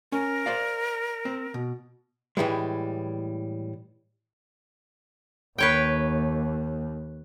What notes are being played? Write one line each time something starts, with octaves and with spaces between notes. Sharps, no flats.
C#4 A#4
C5 D5 F5
C4
B2
A2 E3 G3 G#3
D#2 B4 C#5 G5